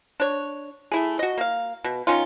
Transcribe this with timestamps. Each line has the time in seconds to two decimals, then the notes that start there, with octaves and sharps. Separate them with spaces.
0.20 D4 C#5
0.92 A3 E4 G#4
1.19 F#4 D#5
1.38 A#3 F5
1.84 B2
2.07 D#3 C#4 D#4 F4